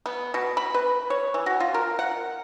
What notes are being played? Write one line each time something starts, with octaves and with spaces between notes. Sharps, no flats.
B3
B2
B5
B4
C#5
E3
F#4
F4
A#4
F#5